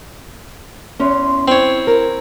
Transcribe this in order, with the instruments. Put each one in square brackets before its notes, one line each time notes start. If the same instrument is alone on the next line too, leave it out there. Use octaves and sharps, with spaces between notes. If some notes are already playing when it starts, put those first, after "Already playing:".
[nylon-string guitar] E2 C#4 [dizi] C6
[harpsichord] C4 C#5 [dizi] E4
[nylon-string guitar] A#4